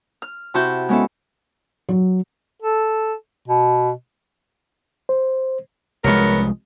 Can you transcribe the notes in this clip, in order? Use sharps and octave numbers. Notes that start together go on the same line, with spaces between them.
F6
C3 E4 F#4 A5 G6
G#3 B3 C#4 E4 A4
F#3
A4
B2
C5
C2 F3 G#3 B3 C#4 A#4